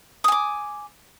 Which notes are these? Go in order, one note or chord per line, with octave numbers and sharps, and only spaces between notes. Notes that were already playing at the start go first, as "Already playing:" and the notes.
G#5 D6 D#6